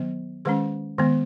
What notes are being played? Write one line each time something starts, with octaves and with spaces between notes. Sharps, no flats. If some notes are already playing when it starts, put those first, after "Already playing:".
Already playing: D#3 F#3 B3
D#3 G#3 C#4 G#4 B4
D#3 G#3 B3